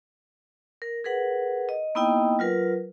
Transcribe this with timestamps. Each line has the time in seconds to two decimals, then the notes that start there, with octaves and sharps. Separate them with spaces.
0.82 A#4
1.04 G#4 A#4 B4 F#5
1.69 D#5
1.95 A#3 B3 D#4 E4 D#5 G5
2.39 F#3 F4 A#4 B4